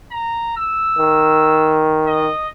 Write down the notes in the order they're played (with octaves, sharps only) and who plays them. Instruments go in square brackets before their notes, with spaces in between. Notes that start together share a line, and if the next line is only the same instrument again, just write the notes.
[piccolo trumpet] A#5
E6
[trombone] D#3
[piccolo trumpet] D#5